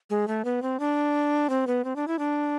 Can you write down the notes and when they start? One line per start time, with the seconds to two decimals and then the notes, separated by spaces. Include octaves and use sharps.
0.10 G#3
0.28 A3
0.45 B3
0.62 C4
0.80 D4
1.50 C4
1.67 B3
1.84 C4
1.96 D4
2.08 E4
2.19 D4